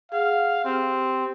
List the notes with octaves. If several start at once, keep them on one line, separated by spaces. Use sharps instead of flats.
G#4 F5 F#5
C4 G4